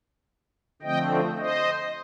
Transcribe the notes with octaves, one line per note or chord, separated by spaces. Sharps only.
D3 F3 A3 C4 D#5 G5
C5 D#5